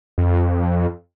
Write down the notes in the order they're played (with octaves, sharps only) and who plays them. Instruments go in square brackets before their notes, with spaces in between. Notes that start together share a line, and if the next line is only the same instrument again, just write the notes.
[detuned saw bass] F2